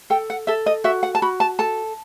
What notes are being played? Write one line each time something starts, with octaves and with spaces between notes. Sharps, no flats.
A4 G5
F#5
A4 E5
D#5
F#4 E5
F#5
A5
F#4 B5
A5
A4 A5